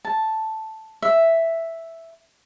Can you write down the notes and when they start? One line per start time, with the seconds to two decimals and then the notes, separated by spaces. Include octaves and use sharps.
0.05 A5
1.02 E5